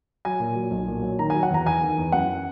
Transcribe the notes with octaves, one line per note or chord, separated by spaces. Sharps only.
F#3 G#5
A#2
F#3
B1
A#2
F#3
D#3 A#5
F#3 G#5
F#5
E2 A#5
E2 G#5
D#3
E2
F#2 F#5